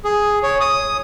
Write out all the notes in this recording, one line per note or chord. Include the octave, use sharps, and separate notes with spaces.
G#4
C#5
D#6